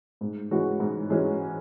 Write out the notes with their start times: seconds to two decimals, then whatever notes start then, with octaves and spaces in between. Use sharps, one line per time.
0.21 G#2
0.51 E3 G#3 C#4 F#4
0.80 G#2
1.10 E3 G#3 C#4 F#4